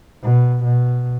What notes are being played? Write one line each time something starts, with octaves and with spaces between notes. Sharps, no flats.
B2
B2